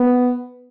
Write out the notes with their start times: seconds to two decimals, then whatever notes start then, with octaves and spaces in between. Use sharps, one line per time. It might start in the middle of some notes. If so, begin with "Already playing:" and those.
Already playing: B3